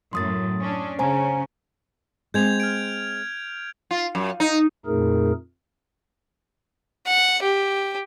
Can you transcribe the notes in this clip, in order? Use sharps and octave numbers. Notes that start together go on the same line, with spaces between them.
F#2 A2 C6 D#6 A6
C#4 D4
C#3 C#4 C5 G#5 A#5
G#3 C4 G6 G#6 F7
F6 G#6 D7
F4
F#2
D#4
F2 A#2 A3 D#4 G#4 A#4
F#5
G4